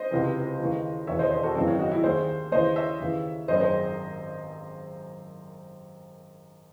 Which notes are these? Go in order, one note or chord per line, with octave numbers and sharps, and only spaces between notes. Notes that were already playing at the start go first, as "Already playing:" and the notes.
Already playing: C5 D#5
C#2 C3 E3
D#2 C#3 E3
E1 D#2 C#3 E3 C#5 E5
C5 D#5
G#4 C5
F#4 A4
G#1 F#2 C#3 E3 C4 D#4
C#4 E4
D#4 F#4
E4 G#4
D#2 D#3 G#4 C5
D#2 C#3 E3 C5 D#5
C#5 E5
D#2 C#3 E3
G#1 F#2 D#3 C5 D#5
G#4 C5